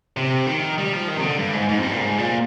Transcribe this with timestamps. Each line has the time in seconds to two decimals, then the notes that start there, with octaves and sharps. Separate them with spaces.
0.17 C3
0.47 D#3
0.78 G3
0.93 F3
1.08 D#3
1.16 C3
1.23 D3
1.37 G2
1.53 G#2
1.69 G#2
1.78 F2
1.83 G2
1.91 A#2
1.98 G#2
2.18 A#2